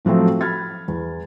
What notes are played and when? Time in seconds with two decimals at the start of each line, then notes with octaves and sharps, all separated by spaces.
0.05 A2 F3 F#3 A3 C4
0.41 B5 F6 G#6 A6
0.88 E2